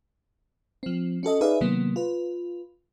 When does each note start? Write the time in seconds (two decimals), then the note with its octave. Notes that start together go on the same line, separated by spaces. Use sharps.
0.83 F3 C4
1.23 C#4 F#4 A4 D#5
1.41 D#4 G#4 B4 D5 E5 F5
1.61 C3 D#3 F#3 A#3 B3
1.96 F4 B4